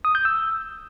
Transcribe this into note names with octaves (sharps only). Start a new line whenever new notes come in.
D#6
G6
E6